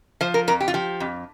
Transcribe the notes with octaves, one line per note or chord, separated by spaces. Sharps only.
F3 C5
A#4
F2 A#4
G4
F4
F3 G4
F2